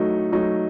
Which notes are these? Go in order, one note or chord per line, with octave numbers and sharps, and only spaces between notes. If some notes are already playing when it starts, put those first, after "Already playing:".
Already playing: F#3 A3 D#4
F#3 A3 D#4